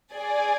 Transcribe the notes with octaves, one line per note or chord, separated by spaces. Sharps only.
G#4 D5 G#5